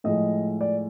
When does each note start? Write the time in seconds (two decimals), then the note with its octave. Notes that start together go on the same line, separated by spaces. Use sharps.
0.04 A2 F3 G#3 D#5
0.61 D5